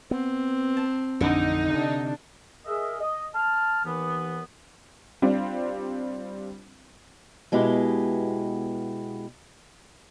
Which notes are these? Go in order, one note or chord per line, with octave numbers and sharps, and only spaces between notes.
B3 C4
A5
A1 F2 D3 D#4
C3 D4
G#4 A#4 D#5 E5
D#5
A5 F6
D#2 E3 B3
G3 C4 D4 F4
B2 G#3 B3 E4 G4